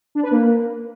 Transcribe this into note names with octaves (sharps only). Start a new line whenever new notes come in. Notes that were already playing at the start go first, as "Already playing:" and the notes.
D4
B4
A#3